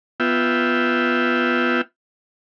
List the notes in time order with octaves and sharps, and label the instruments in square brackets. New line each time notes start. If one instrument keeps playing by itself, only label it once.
[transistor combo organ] B3 F4 E5 G5